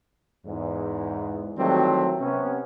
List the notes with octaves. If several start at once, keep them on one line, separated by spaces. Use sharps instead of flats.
E2 G#2
D#3 E3 F#3 G3 A3 C4
C3 B3 C#4